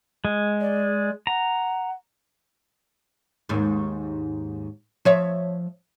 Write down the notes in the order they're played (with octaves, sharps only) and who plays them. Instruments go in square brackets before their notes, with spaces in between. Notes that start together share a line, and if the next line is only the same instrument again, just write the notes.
[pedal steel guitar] G#3
[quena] D5
[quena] F#5 [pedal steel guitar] A#5
[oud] D#2 G#2
F3 C#5 E5